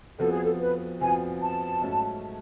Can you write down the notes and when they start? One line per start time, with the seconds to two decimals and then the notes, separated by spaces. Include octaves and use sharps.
0.18 F2 F3 B3 F#4 A4
0.31 G#4
0.44 A4
0.60 B4
1.01 F2 F3 B3 F#4 G#5
1.41 A5
1.81 G#2 F#3 A3 C#4 F#4